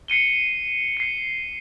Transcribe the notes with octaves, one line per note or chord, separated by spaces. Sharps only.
C7 C#7 D#7 G7
C7 C#7